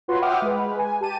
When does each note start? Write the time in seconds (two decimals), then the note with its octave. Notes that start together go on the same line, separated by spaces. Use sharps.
0.08 F4 F#4 B4 C#5 C6
0.22 E5 F#5 G5 D6 D#6 F6
0.42 G#3 B4
0.79 G#5
1.01 G4 A5 D#7